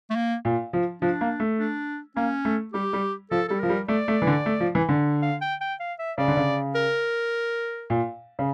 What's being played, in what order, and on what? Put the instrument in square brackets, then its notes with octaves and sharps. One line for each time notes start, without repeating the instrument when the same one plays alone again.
[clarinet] A3
A#3
[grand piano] A#2
F3
[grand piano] F3 [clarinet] D4
[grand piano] A#3
A3
[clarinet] D4
[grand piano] A#3 [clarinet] C#4
[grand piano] A3
[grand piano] G3 [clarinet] G4
[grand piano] G3
[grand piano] F3 [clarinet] A4
[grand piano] G3 [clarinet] A4
[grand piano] F3 [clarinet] A#4
[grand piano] G3
[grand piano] A3 [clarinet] D5
[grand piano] A3
E3
D3
A3
F3
E3
D3
[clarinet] F5
G5
G5
F5
E5
[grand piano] C#3 [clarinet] D5
[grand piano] D3
C#3
[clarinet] A#4
[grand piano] A#2
C#3